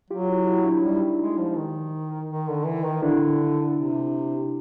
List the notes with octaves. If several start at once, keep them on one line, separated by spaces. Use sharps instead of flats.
F#3 F4 G4
E4 F#4
E4 F#4
D4 E4
G3 D#4
G#3
F3
D#3
D#3
D3
E3
D#3
D3 D4 E4
C3